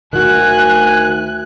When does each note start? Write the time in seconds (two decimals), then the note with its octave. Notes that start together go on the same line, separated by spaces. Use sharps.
0.13 D2 D#3 F#4 G#5 F#6